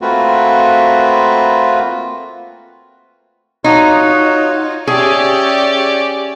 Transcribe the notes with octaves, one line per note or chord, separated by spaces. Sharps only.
A3 A#3 C4 F4 F#4 B4
D#4 F4 F#4 C#5
C#4 G4 G#4 D5 E5 C#6